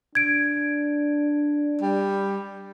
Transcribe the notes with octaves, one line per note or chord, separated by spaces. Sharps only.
D4 G#6 D7
G3